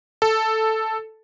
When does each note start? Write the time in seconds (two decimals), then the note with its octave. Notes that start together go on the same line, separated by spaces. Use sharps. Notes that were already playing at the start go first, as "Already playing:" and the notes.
0.22 A4